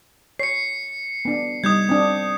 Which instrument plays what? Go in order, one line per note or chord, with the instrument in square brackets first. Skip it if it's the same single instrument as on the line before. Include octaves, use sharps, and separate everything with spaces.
[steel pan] C#5 [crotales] C7 C#7
[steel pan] B3 D4
[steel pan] G3 D#4 [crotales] D#6 G6 G#6
[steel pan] C4 D4